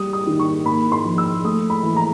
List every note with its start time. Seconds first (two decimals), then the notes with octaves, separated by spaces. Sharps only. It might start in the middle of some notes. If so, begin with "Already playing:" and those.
Already playing: G3 D#6
0.13 D#6
0.27 D#3
0.39 C#6
0.66 A#3 B5
0.92 C6
1.05 F3
1.18 E6
1.44 A3 D#6
1.70 B5
1.83 E3
1.97 A#5